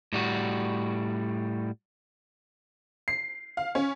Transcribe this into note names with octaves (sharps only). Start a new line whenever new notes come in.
A2 G3 F#4
C7
F5
C#4